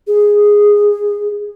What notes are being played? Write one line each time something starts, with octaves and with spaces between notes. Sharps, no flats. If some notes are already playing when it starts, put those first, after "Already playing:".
G#4